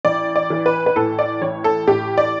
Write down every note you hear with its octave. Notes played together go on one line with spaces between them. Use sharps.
A1 D5
D5
E3
B4
B4
A2 A4
D5
A1 C#5
A4
A2 G4
D5